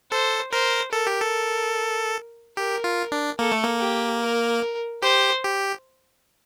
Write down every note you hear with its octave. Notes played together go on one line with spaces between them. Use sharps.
A4 C5
A#4 C5
A4 A#4
G4
A4
G4 A#4
F4
D4
A#3 A4
A3
A#3
G4
A#4
G4 C5
G4